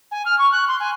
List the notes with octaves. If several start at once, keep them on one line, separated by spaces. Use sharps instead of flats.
G#5
F6
C#6
F#6
C6
G#5